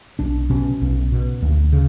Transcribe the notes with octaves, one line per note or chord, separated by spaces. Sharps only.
B1 D4
B2 C#4
B1
B2
D2
C#3